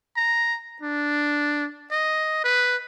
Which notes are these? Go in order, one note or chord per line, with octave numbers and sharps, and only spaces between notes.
A#5
D4
D#5
B4